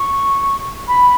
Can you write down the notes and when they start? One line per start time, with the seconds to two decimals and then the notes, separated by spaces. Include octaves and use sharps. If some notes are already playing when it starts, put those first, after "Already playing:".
Already playing: C#6
0.88 B5